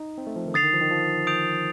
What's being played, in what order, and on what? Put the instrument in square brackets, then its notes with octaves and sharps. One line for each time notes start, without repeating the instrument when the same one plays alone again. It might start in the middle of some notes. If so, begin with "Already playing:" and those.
Already playing: [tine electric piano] D#4
C4
A3
F3
D#3
[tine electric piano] D3 [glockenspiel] D#6 A6 C7 F7
[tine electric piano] D#3
F3
D#3
F3
[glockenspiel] D#6 G6 D7 F7